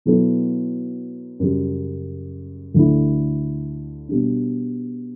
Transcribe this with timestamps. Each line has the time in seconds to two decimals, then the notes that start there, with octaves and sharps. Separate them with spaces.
0.05 B2 F#3 B3 E4 A4
1.39 F#2 C#3 G3
2.74 D2 D3 A3 E4
4.09 B2 G3 D4